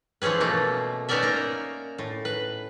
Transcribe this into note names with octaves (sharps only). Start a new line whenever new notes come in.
E3 F3 C#4 G#4 B4
B2 A3 A#3
B3 C#4 D#4 A#4 D5 E5
A#3 A#5
A2
B4